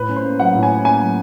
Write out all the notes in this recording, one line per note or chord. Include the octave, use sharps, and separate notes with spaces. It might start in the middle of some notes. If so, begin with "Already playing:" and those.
Already playing: A2 B4
C#4
C5
A#3
F#3 F#5
A2
G#5
C#4
A#3 G#5
F#3